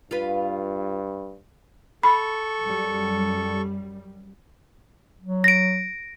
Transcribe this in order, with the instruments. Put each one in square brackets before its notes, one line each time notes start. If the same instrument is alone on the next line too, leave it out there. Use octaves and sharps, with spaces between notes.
[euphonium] G2 [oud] F4 B4
[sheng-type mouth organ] A4 C#6 [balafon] B5
[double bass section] F#2 G3
[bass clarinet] F#3
[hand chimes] A#6 D7